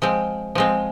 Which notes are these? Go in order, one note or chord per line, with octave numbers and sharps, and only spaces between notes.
F3 G#3 C4
F3 G#3 C4